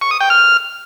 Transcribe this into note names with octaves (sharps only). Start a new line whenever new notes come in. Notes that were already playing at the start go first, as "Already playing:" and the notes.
C#6
D#6
G5
F6